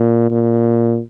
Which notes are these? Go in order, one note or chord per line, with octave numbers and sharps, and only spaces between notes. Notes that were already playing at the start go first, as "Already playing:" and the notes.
Already playing: A#2
A#2